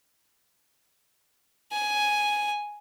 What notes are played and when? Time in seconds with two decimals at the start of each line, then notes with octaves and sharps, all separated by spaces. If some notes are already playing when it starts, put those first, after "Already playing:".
1.72 G#5